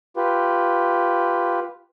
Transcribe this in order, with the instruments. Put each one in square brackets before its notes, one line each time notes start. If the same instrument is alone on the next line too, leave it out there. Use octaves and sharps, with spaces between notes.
[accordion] F4 G4 B4